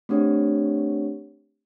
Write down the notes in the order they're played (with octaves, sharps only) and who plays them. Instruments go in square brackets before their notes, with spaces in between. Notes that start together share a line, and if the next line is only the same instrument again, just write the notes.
[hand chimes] A3 C4 D4 G4 C#5